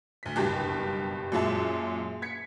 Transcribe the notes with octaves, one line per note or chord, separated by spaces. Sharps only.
D2 B6
F#1 B1 G2 G4
F#2 A#2 G#3 E5 A5
G#6 B6 C#7